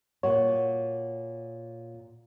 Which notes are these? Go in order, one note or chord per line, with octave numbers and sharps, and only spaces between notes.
A#2 F#4 C#5